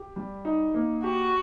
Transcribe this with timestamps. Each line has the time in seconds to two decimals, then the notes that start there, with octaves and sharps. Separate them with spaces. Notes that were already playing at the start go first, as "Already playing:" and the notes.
Already playing: G4
0.16 G3
0.45 D#4
0.74 A#3
1.04 F#4 G4